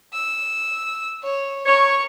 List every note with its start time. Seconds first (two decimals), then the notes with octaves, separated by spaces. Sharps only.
0.14 E6
1.23 C#5
1.66 A#4 C#5 C#6